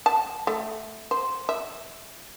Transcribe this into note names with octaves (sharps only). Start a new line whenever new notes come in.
A5
A3
C5
E5